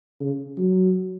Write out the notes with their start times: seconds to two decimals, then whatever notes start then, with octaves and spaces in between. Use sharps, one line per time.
0.20 C#3
0.58 F#3